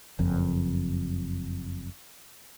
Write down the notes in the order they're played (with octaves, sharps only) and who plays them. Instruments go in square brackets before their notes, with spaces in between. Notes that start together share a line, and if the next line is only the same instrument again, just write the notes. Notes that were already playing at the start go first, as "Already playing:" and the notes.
[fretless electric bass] F#1 F2